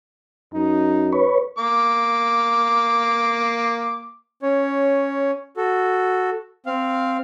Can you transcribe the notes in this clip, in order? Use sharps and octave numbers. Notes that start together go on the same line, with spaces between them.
F#2 D#4
B4 C#5
A#3 D6
C#4 C#5
F#4 A4
C4 F5